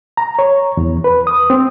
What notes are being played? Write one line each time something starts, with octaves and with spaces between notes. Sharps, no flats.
A#5
C#5
E2
B4
D#6
C4